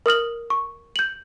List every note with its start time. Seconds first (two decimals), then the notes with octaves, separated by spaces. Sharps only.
0.06 A#4 D#6 F6 F#7
0.50 C#6
0.96 G6 F#7